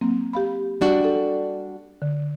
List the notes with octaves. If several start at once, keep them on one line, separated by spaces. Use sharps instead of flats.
F#3 A#3 C4
G4 F5 B5
G3 D4 F#4
A4
D3